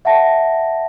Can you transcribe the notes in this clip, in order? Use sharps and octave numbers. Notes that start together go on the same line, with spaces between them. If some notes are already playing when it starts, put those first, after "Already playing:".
E5 F#5 G5 A5 A#6